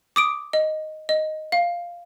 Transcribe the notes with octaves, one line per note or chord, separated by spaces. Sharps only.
D6 D#6 D7
D#5
D#5
F5